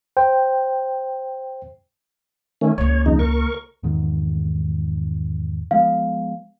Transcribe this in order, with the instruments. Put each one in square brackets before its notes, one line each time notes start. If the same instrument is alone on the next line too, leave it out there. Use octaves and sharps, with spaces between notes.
[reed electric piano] C5 G5
[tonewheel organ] D#3 A3 C#4
[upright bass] C#2 A#3 [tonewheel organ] C#5
[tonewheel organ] F2 C#3 D#4
A#4 C#6
[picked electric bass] E2 G#2 D#3
[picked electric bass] F3 G#3 B3 [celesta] F5